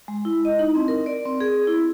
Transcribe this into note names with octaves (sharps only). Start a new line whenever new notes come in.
G#3
E4
D#5
D#4
C4
A#4
D5
C4
G#4
E4